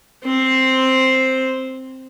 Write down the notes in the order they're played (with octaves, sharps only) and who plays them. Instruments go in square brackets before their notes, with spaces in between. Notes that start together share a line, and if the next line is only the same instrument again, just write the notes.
[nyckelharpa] C4 C5